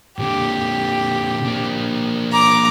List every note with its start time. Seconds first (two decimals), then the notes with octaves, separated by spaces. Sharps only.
0.19 A#2 D3 G4
1.46 A#3 D4
2.32 A#5 D6